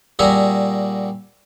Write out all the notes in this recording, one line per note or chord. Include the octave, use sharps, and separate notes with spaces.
A#2 G3 F#4 G#4 E5 A#5